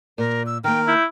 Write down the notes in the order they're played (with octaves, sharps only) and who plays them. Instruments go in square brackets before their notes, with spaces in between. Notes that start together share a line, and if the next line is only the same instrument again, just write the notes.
[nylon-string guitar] A#2 [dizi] A#4
[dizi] E6
[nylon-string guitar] D#3 A#3 [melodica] A#4 [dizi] G5
[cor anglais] E4 [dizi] G6